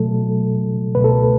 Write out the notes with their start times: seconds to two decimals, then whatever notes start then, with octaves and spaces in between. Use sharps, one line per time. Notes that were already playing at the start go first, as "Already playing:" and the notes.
Already playing: B2 F#3 A3 A4
0.95 C#2 B2 A3 B4
1.04 A4